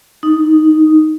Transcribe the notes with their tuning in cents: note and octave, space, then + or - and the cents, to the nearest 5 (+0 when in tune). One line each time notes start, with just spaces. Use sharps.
D#4 +0